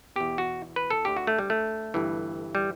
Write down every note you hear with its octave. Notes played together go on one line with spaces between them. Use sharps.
E2 B2 G4
F#4
B4
A4
D2 D3 G4
F#4
A3
G3
A3
G1 G2 E3
G3